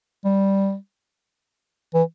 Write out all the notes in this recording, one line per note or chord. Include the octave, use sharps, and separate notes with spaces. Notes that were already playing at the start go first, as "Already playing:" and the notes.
G3
E3